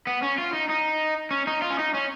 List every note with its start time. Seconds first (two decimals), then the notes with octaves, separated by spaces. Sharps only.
0.07 B3
0.23 C#4
0.38 F4
0.54 D#4
0.70 D#4
1.31 C#4
1.47 D#4
1.62 F4
1.70 C#4
1.78 D#4
1.94 C#4